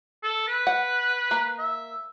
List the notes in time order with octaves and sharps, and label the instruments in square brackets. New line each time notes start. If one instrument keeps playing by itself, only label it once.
[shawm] A4
B4
[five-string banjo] F#5
A#3
[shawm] E5